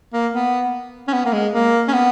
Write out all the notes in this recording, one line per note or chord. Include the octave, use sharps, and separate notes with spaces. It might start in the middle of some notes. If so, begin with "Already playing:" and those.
A#3
B3
C#4
B3
A#3
G#3
A#3
C#4
B3